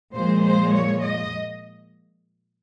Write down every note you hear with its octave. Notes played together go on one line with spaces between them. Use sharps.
A#2 F3 G#3 C5
C5
C#5
D#5